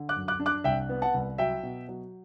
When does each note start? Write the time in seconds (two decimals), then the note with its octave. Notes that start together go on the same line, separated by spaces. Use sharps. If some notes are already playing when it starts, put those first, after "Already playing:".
Already playing: D3
0.09 D6 F#6
0.16 F#2
0.28 D6 F#6
0.40 D4
0.46 D6 F#6
0.64 C2 E5 G5
0.89 B3
1.02 F#5 A5
1.14 C2
1.38 F#3 E5 G5
1.63 B2
1.89 F#3